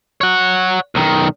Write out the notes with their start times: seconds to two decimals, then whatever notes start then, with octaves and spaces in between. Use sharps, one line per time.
0.21 C#5 F#5
0.95 B1 D#3